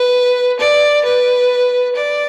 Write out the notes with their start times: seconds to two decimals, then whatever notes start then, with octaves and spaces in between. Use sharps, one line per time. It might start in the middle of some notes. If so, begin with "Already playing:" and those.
Already playing: B4
0.60 D5
1.05 B4
1.96 D5